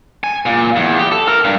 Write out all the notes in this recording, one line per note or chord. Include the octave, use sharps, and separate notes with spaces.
G#5
A#2
E2
G4
A4
A#4
G2